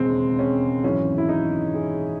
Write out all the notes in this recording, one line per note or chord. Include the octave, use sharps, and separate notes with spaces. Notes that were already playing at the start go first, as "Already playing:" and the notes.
Already playing: E1 D#2 C#3 G#3 C4
C#4
G#1 F#2 E3 C#4
E4
D#4
G#4